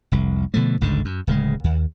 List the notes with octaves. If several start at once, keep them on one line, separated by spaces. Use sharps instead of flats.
F1 C2
B2 D3 F3 A3
G1 C#2 G#2 D3
F#2
D1 C#3 G#3
D#2